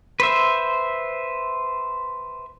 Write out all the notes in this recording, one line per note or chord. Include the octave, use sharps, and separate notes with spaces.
B4 C5 E5